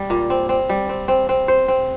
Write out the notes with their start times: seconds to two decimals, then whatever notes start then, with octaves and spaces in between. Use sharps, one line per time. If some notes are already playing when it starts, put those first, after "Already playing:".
Already playing: G3
0.10 A#2
0.30 C4
0.49 C4
0.69 G3
0.89 C4
1.08 C4
1.29 C4
1.48 C5
1.68 C4